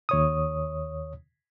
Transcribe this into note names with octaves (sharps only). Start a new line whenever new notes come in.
D#2 C#5 D#6